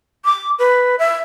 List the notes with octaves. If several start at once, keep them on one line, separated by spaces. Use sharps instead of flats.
D6
B4
E5